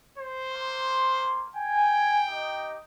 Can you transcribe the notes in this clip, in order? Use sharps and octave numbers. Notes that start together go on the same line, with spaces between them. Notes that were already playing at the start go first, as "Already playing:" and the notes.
C5
A#3 C6
G5 G#5
D#4 G4 D#5